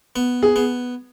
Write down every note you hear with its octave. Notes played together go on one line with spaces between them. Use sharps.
B3
G#4
B3